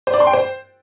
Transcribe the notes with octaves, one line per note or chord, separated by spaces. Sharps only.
C5
D5
C6
G5
C5